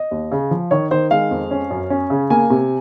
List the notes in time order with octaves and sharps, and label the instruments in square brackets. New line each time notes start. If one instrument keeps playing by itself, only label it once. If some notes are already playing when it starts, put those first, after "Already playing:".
Already playing: [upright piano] D#5
D#2
C#3
F3
D#3 C#5
D#3 C5
G#3 F5
F2
C#4
F#2
C#4
C#3
A#3 G#5
C3